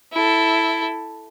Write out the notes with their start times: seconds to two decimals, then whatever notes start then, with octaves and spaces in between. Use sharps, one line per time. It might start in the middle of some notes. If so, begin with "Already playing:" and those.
0.13 E4 A4